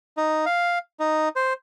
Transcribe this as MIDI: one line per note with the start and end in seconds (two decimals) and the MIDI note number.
0.17 0.45 63
0.46 0.79 77
1.00 1.29 63
1.36 1.53 72